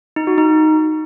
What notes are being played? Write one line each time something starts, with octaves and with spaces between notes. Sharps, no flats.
D#4
F#4
D#4